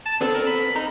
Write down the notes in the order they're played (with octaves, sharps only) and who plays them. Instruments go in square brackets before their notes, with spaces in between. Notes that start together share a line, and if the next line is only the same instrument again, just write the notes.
[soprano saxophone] A5
[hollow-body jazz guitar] B3 C4 A4 [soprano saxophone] D4
[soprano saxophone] A#4
B5
[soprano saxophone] D#4 [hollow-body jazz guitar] A#5